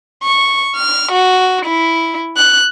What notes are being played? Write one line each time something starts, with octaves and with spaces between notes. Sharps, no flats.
C#6
F6
F#4
E4
F#6